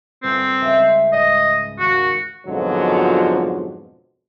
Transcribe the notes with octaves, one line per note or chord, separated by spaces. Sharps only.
G1 C4 C5
C#2 E5
G#2 D#5
D#2 F#4 A#6
F2 G#2 B2 D3 F3 F#3